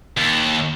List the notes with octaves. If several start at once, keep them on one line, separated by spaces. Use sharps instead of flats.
D#2